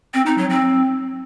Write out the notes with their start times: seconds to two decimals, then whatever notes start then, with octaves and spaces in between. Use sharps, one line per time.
0.14 C4
0.26 D#4
0.38 F#3
0.50 C4